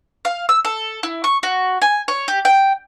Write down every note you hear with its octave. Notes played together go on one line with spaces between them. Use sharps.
F5
E6
A4
E4
C#6
F#4
G#5
C#5
G4
G5